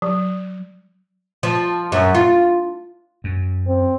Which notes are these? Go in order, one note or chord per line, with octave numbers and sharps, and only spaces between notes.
F#3
F3
F#2
F4
F#2
C4